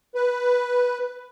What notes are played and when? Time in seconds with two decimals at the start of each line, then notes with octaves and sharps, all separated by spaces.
0.15 B4